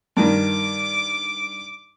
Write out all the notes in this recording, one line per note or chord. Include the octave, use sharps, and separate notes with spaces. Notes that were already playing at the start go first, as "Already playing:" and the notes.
G2 D#3 D6